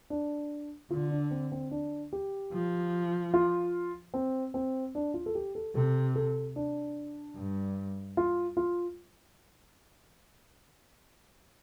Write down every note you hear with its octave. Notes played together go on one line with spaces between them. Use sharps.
D4
D3 F4
D4
C4
C4
D4
G4
F3
F4
C4
C4
D4
F4
A4
G4
A4
C3 A4
A4
D4
G2
F4
F4